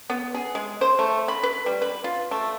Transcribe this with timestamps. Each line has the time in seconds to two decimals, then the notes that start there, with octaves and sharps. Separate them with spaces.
0.10 B3
0.34 G#4
0.55 G#3
0.81 C5
0.99 A3
1.28 B5
1.43 B4
1.66 G3
1.82 B4
2.04 F4
2.31 A3